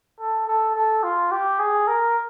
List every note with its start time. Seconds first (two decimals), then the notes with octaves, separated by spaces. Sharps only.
0.19 A4
0.47 A4
0.75 A4
1.03 F4
1.31 G4
1.59 G#4
1.87 A#4